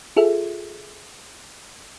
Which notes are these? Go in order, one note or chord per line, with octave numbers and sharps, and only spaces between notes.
F4 G#4 A4 E5